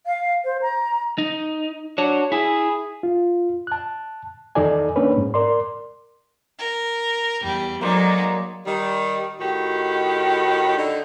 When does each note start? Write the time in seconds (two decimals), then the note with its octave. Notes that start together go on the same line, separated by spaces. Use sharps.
0.06 F5
0.45 C5
0.62 A#5
1.18 D#4
1.98 D4 F#4 C#5
2.32 E4 G#4
3.03 F4
3.67 A5 F#6
4.55 E2 D#3 D#4 A4 D5 G#5
4.96 A#3 C#4 D4 B4 C#5
5.17 G#2
5.34 A#4 D5 C6
6.59 A#4
7.42 E2 G3
7.81 F#3 G#3 A#3 D#4 C5 D5
8.66 D#3 G3
9.40 A2 D#3 F#4 G4
10.77 D3 D#4